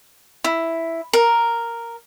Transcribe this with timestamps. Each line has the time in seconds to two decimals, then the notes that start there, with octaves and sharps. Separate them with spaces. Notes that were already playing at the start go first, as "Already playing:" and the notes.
0.44 E4
1.13 A#4